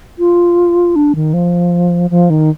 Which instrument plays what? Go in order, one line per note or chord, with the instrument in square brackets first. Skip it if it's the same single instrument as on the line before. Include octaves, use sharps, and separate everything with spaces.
[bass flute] F4
D4
D#3
F3
F3
D#3